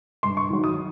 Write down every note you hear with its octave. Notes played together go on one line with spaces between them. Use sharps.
G2 C6
C#6
D#3 F#3
D#6